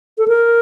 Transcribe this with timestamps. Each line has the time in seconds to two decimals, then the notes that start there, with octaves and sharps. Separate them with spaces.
0.18 A4
0.28 A#4